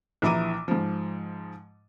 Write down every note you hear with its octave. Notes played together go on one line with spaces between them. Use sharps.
A#1 E3 E4 A#5 D6 D#7
G#2 F3